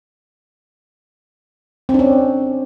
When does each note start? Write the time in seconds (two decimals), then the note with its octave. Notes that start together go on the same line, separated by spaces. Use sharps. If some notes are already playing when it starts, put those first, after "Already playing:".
1.89 C4
1.94 D4
1.99 C#4